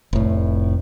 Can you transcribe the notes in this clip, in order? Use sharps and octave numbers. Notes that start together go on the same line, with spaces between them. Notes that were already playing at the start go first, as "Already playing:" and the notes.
F1 A2